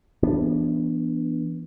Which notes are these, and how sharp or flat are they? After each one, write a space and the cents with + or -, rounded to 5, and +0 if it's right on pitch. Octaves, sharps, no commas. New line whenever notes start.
E3 +15 B3 -25 D4 +0